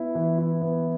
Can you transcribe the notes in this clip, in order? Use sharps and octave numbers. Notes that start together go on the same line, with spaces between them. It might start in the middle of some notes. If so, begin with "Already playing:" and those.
Already playing: B3 E4
E3
E4
B3